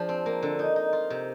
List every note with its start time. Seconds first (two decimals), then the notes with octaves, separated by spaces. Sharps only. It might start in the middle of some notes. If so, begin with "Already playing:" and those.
Already playing: F3 D4 G#4
0.09 C4
0.26 A#3
0.42 D3
0.59 D#4
0.76 D#4
0.93 F4
1.10 C3